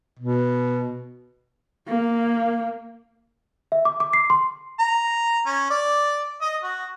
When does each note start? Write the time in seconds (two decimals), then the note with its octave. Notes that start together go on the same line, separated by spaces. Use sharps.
0.20 B2
1.88 A#3
3.72 E5
3.85 D6
4.00 D6
4.13 C7
4.30 C6
4.79 A#5
5.46 C#4
5.70 D5
6.41 D#5
6.63 F#4